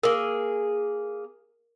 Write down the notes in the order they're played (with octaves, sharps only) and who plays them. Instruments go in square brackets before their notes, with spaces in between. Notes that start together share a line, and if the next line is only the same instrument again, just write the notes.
[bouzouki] A#3 G#4 [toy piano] A#4